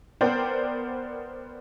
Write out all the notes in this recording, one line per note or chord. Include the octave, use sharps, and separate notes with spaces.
B3 A#4 C5 D5 G5